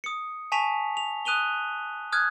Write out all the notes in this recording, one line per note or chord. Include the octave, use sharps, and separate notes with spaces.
D#6 C#7
G#5 A5 C#6 B6 F7
F7
D#6 F#6 D#7 F7 G7
D#6 F6 F#6 G#6